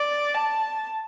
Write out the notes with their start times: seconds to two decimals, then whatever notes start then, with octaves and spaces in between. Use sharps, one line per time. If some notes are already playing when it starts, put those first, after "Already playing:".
Already playing: D5
0.35 A5